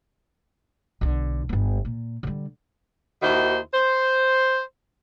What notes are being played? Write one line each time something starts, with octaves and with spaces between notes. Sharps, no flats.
B1 D3
G1 B3
A#2
D3 G3
D#2 D#3 E4 F#4 C5
C5